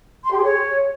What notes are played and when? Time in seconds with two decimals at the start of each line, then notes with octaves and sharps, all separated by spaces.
0.25 C6
0.31 G4
0.37 G#4
0.43 C#5